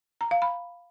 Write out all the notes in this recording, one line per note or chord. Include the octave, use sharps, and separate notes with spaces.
A#5
F5
B5